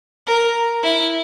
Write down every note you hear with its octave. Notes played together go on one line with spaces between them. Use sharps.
A#4
E4